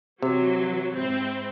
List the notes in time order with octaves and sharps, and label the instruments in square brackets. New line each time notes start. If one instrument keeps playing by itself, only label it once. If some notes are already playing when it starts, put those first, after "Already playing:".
[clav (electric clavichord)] C3 [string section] E3 F#3
[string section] G#2 C4 E4